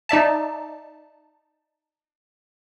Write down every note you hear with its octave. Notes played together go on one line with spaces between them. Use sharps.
D#4 D5 E5 A5